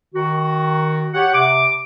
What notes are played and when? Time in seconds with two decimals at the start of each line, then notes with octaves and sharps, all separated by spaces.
0.14 D#3 F#4
1.14 G4 C#5 F#5
1.34 C3 D6